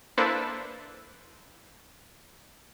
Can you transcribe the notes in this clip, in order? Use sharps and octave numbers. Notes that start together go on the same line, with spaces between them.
A#3 D4 E4 A4 B4 C5